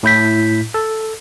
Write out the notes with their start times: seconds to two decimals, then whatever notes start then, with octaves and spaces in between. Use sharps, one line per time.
0.03 A2 E4 G6 B6
0.74 A4